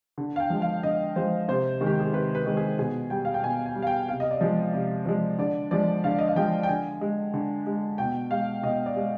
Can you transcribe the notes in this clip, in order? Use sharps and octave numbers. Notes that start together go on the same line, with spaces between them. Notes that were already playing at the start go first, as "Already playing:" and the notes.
D3
F5
G5
F3 G#3
F5
D3 D#5
F3 G#3 C5
C3 C5
D#3 G#3
G4
G#4
C3 B4
B4
D#3 G#3
G#4
B2 G#4
G3 G5
F5
G5
B2 G#5
G#5
G3
F5
G5
C3 F5
D#5
D5
F3 G#3 D#5
C3
F3 G#3
D3 D5
F3 G#3 D5
D3 F5
D#5
F5
F3 G#3 G5
G5
D3 G#5
G#3
D3
G#3
B2 G5
G#3 F5
B2 D#5
D5
G#3